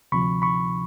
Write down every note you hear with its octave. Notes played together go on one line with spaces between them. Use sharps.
D2 C3 F3 B5 C#6
B5 C#6